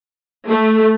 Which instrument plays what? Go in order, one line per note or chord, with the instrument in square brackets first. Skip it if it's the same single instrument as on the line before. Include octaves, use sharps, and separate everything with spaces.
[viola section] A3